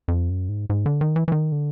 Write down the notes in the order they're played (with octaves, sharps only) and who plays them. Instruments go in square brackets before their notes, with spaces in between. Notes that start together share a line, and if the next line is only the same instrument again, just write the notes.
[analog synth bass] F2
F#2
G#2
G#2
D3
D#3
E3
E3
D#3
D3